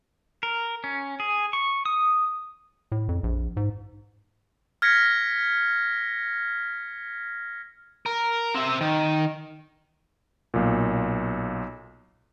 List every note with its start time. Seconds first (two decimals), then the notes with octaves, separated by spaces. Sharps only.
0.43 A#4
0.84 C#4
1.20 G#4
1.53 C#6
1.86 D#6
2.92 A2
3.09 F2
3.23 A#1
3.57 G#2
4.82 F6 G#6 A#6 B6 C#7
8.06 A#4
8.55 C4 E5
8.81 D#3
10.54 B1 A#2